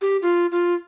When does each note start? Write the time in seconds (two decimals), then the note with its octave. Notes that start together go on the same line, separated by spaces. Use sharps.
0.01 G4
0.22 F4
0.52 F4